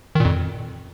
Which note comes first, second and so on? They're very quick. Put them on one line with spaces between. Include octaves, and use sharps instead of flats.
D#3 A#2 F2